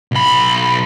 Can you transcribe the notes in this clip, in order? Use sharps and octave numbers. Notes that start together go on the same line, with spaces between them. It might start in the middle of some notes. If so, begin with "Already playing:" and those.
B1 B5